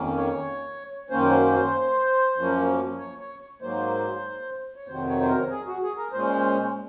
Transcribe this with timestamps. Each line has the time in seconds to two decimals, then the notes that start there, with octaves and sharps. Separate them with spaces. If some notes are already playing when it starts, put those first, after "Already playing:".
Already playing: F2 D#3 A#3 C#4
0.17 C#5
1.10 F#2 D#3 A#3 C#4 C5
1.31 C5
1.53 C5
2.36 F#2 F3 A#3 C#4
2.99 C#5
3.21 C#5
3.62 G#2 F#3 A#3 C5
4.76 C#5
4.88 F2 C3 D#3 F#3 C5
5.09 C#5
5.21 C5
5.29 A#4
5.50 G#4
5.67 F#4
5.82 G#4
5.97 A#4
6.13 A#2 G#3 C#4 C5